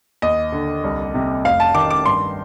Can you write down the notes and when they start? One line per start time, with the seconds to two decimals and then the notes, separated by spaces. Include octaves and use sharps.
0.22 D#2 D#5
0.52 D3
0.84 C2
1.14 C3
1.45 F1 F5
1.60 A5
1.75 D#3 D6
1.90 D6
2.06 G2 C6